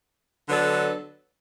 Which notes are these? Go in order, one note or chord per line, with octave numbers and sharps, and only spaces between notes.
D3 F#3 B3 D4 A4